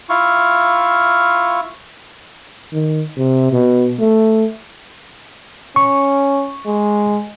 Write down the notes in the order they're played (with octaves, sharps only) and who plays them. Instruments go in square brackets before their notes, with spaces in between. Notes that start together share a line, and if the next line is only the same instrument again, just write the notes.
[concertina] E4 F4 F5 C#6
[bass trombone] D#3
C3
B2
A3
[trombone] C#4 [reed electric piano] C#6
[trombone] G#3